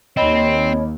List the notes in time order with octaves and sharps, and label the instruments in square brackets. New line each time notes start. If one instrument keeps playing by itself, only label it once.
[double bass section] D#2 [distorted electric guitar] C4 [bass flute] C#5 [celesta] D#5 B5